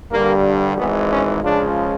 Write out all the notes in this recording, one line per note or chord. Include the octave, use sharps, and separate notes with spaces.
G2 D3 G3 A#3
G#1 G#2 E3 G#3 B3
C#4
C#2 C#3 F3 G#3 D4